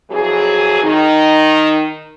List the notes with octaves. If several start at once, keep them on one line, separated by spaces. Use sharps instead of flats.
F2 E3 F#3 G#4
D#3 D#4